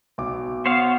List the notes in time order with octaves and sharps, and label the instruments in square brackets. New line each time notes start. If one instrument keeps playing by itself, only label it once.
[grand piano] B1 D6
[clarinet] B3 [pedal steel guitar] C5 C#5 F5